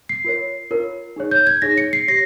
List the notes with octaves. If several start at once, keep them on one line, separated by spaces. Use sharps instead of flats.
C7
F4 A#4 C#5
F4 A#4 C#5
D#4 G#4 C#5
G6
G#6
D#4 G#4 C#5 A#6
C#7
C7
G4 C#5 A#6